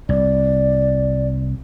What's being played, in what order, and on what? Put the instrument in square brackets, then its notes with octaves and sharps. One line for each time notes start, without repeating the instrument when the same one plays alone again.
[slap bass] C2 [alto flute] D5